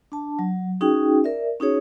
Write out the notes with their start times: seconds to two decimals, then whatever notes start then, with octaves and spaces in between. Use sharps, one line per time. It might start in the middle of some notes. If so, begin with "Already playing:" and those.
0.12 D4 A5
0.39 F#3
0.81 C#4 D#4 F#4 G#4 G5
1.24 A#4 D5 E5
1.60 C#4 D#4 F#4 G#4 C#5